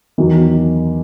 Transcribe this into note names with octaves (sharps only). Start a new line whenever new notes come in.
E2 D#3 F#3